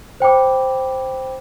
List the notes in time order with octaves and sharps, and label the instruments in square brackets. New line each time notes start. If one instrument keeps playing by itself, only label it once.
[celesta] C5 G5 B5 D6